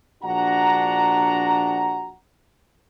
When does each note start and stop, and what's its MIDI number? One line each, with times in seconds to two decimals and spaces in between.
0.24 2.14 34
0.24 2.14 62
0.24 2.14 66
0.24 2.14 78
0.24 2.14 82